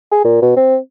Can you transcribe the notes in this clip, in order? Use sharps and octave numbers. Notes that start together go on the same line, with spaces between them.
G#4
A#2
B2
C4